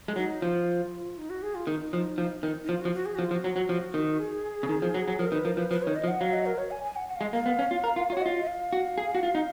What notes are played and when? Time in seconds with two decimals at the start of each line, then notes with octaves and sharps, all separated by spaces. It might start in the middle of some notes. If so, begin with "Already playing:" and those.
0.08 G#3
0.16 F#3 D#4
0.42 F3 F4
1.17 D#4
1.30 F#4
1.43 G#4
1.55 F4
1.67 D#3 D#4
1.93 F3
2.18 F3
2.43 D#3
2.64 D#4
2.68 F3 F4
2.81 F#4
2.85 F3
2.93 F#4
3.06 G#4
3.15 F3 F#4
3.25 F4
3.31 F3
3.34 F#4
3.44 F#3
3.56 F#3
3.69 F3
3.94 D#3
4.19 G#4
4.63 C#3
4.69 D#3
4.82 F3
4.94 F#3
5.08 F#3
5.19 F3 A#4
5.32 D#3 B4
5.45 F3 A#4
5.57 F3 B4
5.70 F3 B4
5.83 D#3 C#5
5.96 D#5
6.04 F3
6.08 F#5
6.20 F#3 F5
6.33 D#5
6.46 A#4
6.58 C#5
6.71 G#5
6.84 G#5
6.96 F#5
7.09 F#5
7.16 F5
7.21 G#3
7.23 D#5
7.31 A#3 F5
7.46 B3
7.59 C#4
7.71 F4
7.84 A#4
7.96 F4
8.10 F4
8.13 F#4 C#5
8.21 F4 D#5
8.42 D#5
8.47 F5
8.73 F#4
8.98 G#4
9.15 F#4
9.23 F4
9.35 D#4